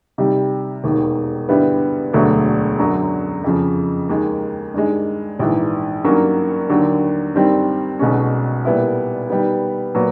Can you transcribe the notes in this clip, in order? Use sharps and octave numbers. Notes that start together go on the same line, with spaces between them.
C3 D#3 G3
E1 D#2 D#3
G2 D3 G3 B3 E4
E1 D2 D3 F#3 A3
F#2 D3 F#3
F2 C#3 F3
D#2 D#3 G#3
G2 D#3 G#3
A#1 G#2 E3
G2 D#3 F#3 A#3 C#4
D#2 D3 F#3
G2 D#3 G3 C4
B1 B2 G#3 C#4
A#2 G3 B3 E4
D#3 G3 B3
A#2 F#3 B3